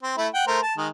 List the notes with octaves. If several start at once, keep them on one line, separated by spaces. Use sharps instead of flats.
C4
A3 E4
F#5 G5
A3 A#4 C5
A5
D#3 G#3